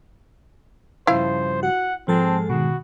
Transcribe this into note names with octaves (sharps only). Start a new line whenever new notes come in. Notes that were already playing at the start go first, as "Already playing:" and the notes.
G2 C#3 F3 E4 C5 F5
F#4 F#5
G#2 F3 G#3 C4 A4 A5
B2 D#3 F#4